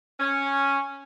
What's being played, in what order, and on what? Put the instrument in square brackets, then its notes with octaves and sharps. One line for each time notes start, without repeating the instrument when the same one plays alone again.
[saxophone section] C#4